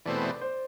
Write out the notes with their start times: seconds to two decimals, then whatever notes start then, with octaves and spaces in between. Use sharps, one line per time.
0.05 E2 B2 A3 C4 D5
0.23 D5
0.41 C5